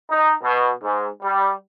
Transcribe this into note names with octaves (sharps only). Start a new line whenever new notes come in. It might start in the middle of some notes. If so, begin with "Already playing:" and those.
D#4
B2
G#2
G3